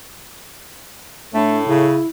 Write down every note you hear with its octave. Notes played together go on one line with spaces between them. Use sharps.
A2 A3 D4
C#3 E4